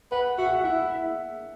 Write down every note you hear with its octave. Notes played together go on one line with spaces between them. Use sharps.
B4 F#5
F#4 E5
F#5
E5
F#4
E4 F#5
E5